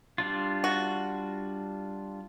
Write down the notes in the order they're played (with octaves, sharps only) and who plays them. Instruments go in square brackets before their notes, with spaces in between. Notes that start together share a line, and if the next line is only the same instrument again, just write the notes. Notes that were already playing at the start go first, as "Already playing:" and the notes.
[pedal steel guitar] G3 D4 F4
[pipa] F#4